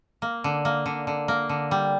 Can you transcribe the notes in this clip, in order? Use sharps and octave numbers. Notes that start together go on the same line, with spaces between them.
A#3
D3
A#3
D3
D3
A#3
D3
G3